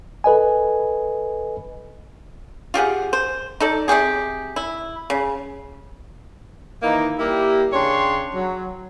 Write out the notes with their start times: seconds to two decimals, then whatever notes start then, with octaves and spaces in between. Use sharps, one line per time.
0.24 A4 B4 D#5 G#5
2.74 F4 G4 G#4 F#5
3.13 C5
3.60 D#4 A4 D5
3.88 C3 F3 G4 G#4
4.56 E4
5.10 C#3
6.82 D#3 E3 A#3 D#4
7.19 G3 A#3 E4 G4
7.72 C#3 D4 C#5 G5 C6
8.35 F#3